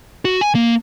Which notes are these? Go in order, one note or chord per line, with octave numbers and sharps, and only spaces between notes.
F#4
G#5
A#3